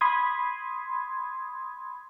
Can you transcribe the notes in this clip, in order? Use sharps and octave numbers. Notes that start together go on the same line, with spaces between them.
B5 C6 D#6 G#6